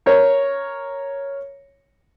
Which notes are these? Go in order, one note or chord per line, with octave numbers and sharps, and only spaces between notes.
A#4 C#5